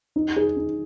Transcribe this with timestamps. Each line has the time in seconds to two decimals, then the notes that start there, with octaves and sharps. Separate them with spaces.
0.16 D#4
0.36 G#4
0.57 D#4